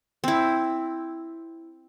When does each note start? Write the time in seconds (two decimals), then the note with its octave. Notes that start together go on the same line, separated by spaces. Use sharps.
0.24 C4 E4